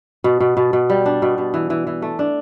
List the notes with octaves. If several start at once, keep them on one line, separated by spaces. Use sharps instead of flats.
B2
B2
B2
B2
G3
D4
B2
B2
E3
E3
E3
A3
D4